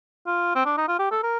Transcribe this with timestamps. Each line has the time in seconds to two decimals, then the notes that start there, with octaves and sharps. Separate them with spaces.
0.26 F4
0.55 C4
0.66 D4
0.77 D#4
0.88 F4
0.99 G4
1.11 A4
1.23 A#4